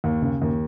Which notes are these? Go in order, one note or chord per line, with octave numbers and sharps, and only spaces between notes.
D#2
C#3
D#2